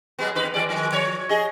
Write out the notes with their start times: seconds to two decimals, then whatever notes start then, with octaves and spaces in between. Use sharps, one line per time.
0.19 F#3 G#3 B3
0.35 E2 D#4 B4
0.54 E3 G#3 D5
0.69 D#3 F3 G#3
0.92 F3 C#5
1.29 G#4 D#5